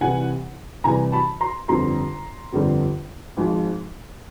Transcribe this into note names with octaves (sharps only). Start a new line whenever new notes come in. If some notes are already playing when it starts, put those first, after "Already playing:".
C2 C3 E3 G3 F#5 G#5
C2 C3 E3 G3 G#5 A#5
A5 B5
A#5 C6
G1 F2 D3 G3 A#5 C6
G1 F2 D3 G3
G#1 G#2 F3